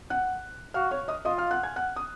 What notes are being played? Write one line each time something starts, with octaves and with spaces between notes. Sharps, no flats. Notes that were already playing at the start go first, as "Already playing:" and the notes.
F#5 F#6
F#4 F5 F6
C#5 C#6
D#5 D#6
F4 D#5 D#6
F5 F6
F#5 F#6
G#5 G#6
F#5 F#6
D#6